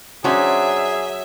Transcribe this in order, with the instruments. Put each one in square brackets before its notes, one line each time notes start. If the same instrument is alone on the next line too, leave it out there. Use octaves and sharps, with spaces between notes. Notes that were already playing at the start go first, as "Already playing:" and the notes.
[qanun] F#3 [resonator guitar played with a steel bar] C#4 D4 C5 [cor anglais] G#4 [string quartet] E5